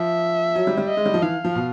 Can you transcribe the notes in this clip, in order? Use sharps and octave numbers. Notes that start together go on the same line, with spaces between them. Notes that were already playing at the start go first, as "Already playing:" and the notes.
Already playing: F3 E5
F#3
G3
G3
D#5
G#3
G3
F3
E3 F5
F3
B2